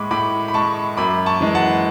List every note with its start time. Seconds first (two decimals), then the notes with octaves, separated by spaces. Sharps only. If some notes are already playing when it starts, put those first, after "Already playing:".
Already playing: A2 G#3 B5 C#6 D6
0.11 A2 B5 D6
0.48 B5
0.54 G#3 A5 C#6
0.97 F#2 B5 D6
1.26 A5 C#6
1.41 E3 G#3
1.55 F#5 A5